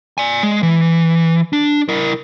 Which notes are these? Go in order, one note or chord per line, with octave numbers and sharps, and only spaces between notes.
D5 G#5
G#3
E3
D4
E4 A#4